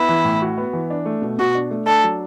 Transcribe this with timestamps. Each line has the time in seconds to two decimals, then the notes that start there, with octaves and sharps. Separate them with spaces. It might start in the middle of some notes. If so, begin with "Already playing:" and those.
Already playing: B3 E4
0.09 E3
0.25 A2
0.42 F#4
0.58 B3
0.73 E3
0.90 D4
1.06 A3
1.22 B2
1.38 B2 F#4
1.55 D4
1.71 A3
1.87 D4 A4
2.03 F#3